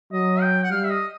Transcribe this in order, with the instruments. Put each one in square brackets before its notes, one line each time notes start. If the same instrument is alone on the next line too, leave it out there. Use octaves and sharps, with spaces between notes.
[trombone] F#3 [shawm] D#5
[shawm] G5
F#5
[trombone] G3 [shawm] F5
[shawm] E5
D#5